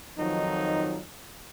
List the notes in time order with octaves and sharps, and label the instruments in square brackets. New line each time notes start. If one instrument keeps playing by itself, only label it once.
[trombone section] F2 D#3 F3 F#3 D#4